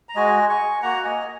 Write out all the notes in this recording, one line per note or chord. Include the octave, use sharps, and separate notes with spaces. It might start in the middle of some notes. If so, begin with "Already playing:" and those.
A#5
G#3 F#4 D#5 G#5
G#5 C#6
A#3 F#4 F#5 A#5
D#5 G#5
G#5